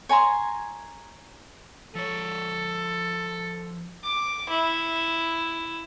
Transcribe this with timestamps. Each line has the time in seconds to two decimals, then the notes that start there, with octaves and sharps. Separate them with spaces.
0.09 C#5 G#5 A#5 C6
1.95 F3 A4 C#5
4.03 D6
4.49 E4